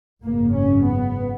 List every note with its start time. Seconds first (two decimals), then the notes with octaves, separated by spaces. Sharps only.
0.22 G#1 F#2 C#3 A#3
0.54 C#4
0.85 B3